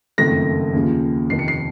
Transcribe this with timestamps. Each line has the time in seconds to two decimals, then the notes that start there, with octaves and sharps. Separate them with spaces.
0.18 F#1 F2 D#3 A3 A#6
0.74 D#2 C#3 F3
1.30 F1 F2 D#3 C7
1.39 C#7
1.48 C7